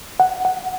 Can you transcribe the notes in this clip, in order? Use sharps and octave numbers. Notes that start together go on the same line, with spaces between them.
F#5
F#5